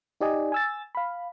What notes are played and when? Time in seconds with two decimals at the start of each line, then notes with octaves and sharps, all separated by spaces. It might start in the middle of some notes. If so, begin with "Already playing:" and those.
0.21 D#4 G4 D5 D#5 G#5
0.52 G#5 E6 A6
0.95 F5 B5